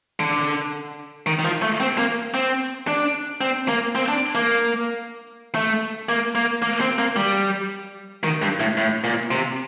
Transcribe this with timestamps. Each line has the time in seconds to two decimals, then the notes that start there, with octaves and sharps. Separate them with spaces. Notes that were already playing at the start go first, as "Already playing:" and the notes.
0.20 D3
1.26 D#3
1.39 D#3
1.44 F3
1.62 A3
1.80 C4
1.98 A#3
2.34 C4
2.88 D4
3.41 C4
3.68 A#3
3.95 C4
4.08 D4
4.35 A#3
5.55 A3
6.09 A#3
6.35 A#3
6.62 A#3
6.81 C4
6.99 A#3
7.16 G3
8.24 D#3
8.42 G2
8.60 A2
8.77 A2
9.04 A#2
9.31 C3